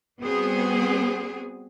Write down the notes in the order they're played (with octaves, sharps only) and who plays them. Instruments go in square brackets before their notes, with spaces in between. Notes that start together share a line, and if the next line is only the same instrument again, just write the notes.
[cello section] G3 B3 C4 F#4 G#4